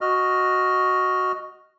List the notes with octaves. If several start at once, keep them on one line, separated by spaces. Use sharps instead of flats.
F#4 D#5 F6